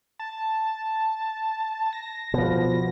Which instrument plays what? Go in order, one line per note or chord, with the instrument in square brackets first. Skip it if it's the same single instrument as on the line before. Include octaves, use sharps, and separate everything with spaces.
[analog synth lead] A5
A#6
[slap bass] B2 F3